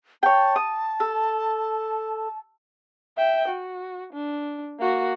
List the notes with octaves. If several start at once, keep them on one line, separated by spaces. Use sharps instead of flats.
C#5 G5 A5
D#6
A4
E5 G5
F#4
D4
A#3 F#4